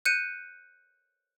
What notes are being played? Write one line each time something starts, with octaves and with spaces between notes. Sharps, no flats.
F#6 G6 C#7 D#7